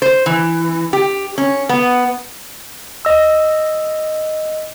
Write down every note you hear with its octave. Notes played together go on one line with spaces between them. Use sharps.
C5
E3
G4
C#4
B3
D#5 E6